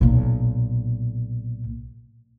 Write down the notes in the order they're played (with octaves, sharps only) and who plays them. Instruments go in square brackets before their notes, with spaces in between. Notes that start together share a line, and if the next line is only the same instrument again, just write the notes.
[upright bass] B1 A#2